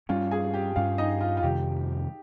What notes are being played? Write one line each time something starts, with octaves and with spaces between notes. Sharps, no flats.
G2 G3 C#4 F4 F5
G#4 G#5
G4 G5
G2 G3 C#4 F4 F5
D#4 D#5
F4
F4
F2 C3 D#3 G3 G4